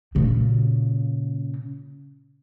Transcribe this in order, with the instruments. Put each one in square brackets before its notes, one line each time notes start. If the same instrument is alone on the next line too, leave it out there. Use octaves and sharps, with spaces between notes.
[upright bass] A#2 C#3